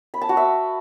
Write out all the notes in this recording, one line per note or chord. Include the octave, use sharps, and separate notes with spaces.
B5
A5
F#4
E5